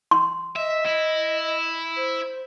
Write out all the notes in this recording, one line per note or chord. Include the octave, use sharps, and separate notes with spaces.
C6
D#5 E5
E4
C5